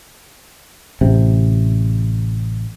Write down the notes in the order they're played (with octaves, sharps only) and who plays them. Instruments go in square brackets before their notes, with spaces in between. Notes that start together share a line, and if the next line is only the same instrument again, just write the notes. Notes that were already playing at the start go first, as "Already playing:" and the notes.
[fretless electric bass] A1 C3